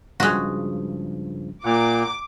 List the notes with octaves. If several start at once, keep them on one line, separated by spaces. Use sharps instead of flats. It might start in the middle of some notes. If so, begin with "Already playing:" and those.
G2 C#3 F3 G#3 F#4
A#2 F#5 A#5 D6